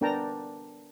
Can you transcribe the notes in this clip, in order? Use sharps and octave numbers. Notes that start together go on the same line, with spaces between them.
B3 D4 A#4 G5 A5 A#5